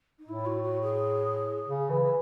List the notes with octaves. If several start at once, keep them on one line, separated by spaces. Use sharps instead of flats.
D#4
A2 E4
F#4
F#4
G#4
C#3
E3
E3